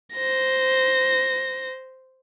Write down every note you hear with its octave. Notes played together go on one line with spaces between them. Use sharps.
C5 A#6